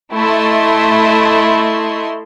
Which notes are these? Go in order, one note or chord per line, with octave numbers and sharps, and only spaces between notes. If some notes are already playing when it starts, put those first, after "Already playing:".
A3 E4 D#5 C6